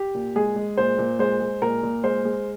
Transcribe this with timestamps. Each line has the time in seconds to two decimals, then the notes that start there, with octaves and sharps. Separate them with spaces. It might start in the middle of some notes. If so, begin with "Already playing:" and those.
Already playing: G4
0.15 A#2
0.36 G#3 G#4
0.56 G#3
0.77 A#2 C5
0.98 A#2
1.19 G#3 C5
1.40 G#3
1.62 A#2 A#4
1.83 A#2
2.04 G#3 C5
2.25 G#3